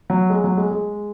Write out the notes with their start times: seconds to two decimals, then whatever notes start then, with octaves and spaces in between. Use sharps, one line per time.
0.10 F#3
0.30 G#3
0.44 F#3
0.58 G#3
0.71 G#3